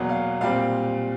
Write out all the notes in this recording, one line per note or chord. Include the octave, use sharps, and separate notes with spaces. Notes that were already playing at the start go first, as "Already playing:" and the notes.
Already playing: E2 B2 F#3 A#3 F#5
F5
A#2 G3 C4 F5